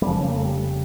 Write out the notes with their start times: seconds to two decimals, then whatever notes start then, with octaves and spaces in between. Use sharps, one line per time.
0.02 G3
0.07 F1 F2 C#3 F3
0.21 C#4
0.28 A#3
0.36 A3
0.45 G3